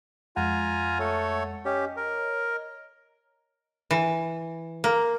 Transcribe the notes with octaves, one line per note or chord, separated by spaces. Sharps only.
F2 G#3 F4 F#5 G#5 A#5
A3 A4 C#5
C#4 G4 C#5 D#5
A#4
E3
A#3